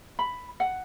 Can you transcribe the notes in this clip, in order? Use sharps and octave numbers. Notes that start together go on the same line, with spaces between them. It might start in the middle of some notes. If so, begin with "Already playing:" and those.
B5
F#5